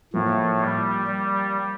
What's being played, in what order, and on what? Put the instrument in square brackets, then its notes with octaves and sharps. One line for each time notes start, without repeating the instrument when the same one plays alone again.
[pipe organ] A2 [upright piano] F3 A#3 F4
[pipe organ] G3
G3